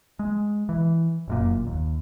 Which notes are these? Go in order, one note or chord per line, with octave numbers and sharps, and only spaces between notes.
G#3
E3
F1 F#2 A#2
D#2